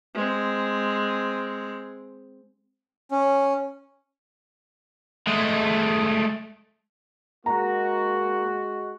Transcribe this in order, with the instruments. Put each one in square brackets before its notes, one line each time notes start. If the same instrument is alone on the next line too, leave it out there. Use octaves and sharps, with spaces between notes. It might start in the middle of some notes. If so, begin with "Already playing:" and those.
[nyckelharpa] G#3 C4
[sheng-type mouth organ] C#4
[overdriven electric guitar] G#3 A3
[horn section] G#3 F#4 [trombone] A#3 [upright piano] A#5